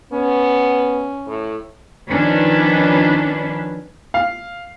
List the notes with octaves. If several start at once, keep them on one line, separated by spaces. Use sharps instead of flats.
B3 C#4
A2
D#3 F3 C#4 D4 B4
F5